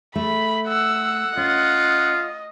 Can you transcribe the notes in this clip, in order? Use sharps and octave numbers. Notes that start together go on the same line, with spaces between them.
A3 B5
F#5 E6
C#4 F4 D#5